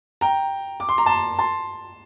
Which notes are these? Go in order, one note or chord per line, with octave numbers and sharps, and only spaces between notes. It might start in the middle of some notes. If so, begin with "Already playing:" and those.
G5 A#5
D6
C6
A#5
A5 C6
A5 C6